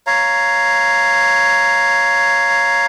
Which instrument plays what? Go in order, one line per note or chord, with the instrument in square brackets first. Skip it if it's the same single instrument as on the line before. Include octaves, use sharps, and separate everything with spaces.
[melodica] C#5 F5 A#5